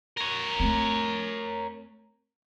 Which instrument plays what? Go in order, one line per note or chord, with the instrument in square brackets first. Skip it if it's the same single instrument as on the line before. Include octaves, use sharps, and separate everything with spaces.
[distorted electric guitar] A#4 C#5
[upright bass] A3 C4